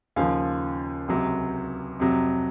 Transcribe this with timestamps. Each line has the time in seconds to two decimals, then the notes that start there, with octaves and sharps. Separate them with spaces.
0.16 D#2 C#3 F3 F5 G#5
1.08 C#2 C3 F#3
2.00 F2 C3 F#3